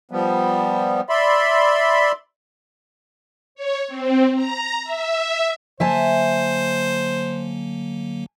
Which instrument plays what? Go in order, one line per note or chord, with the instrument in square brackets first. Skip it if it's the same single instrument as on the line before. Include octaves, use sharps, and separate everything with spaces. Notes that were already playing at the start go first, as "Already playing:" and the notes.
[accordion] F3 G3 B3
D5 E5 B5 C6
[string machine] C#5
C4
A#5
E5
[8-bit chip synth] D3 F#3 A#3 [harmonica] C5 [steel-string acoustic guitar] E5 G#5 A5